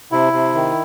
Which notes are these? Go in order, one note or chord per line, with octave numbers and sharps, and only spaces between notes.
C3 E4
C3
D#3